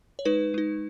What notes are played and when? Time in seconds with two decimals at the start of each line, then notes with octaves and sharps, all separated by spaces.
0.19 C#5
0.25 G#3 D#4 B4
0.54 G#3 D#4